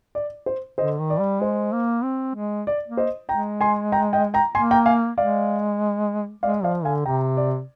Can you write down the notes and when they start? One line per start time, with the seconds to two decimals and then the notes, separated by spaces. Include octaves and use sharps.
0.15 D5
0.46 C5
0.78 D3 C5 D#5
1.00 D#3
1.10 D5
1.20 G3
1.41 G#3 C5
1.72 A#3
2.03 C4
2.36 G#3
2.67 D5
2.88 A#3
2.97 C5 D#5
3.29 G#3 G5 A#5
3.61 G#5 C6
3.92 G5 A#5
4.13 D#5 G5
4.34 G5 A#5
4.54 A#3 G#5 C6
4.71 G5 A#5
4.86 F5 G#5
5.18 G#3 D5 F5
6.43 G#3 D5 F5
6.63 F3 D5 F5
6.85 D3 F5 G#5
7.05 C3 G5 A#5
7.37 D5